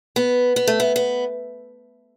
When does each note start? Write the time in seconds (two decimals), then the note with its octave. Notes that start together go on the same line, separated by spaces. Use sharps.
0.16 B3
0.56 B3
0.68 A3
0.80 B3
0.96 B3